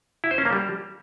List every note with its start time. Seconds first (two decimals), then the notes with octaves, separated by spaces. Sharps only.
0.24 E4
0.31 C5
0.38 C#4
0.45 A#3
0.53 G3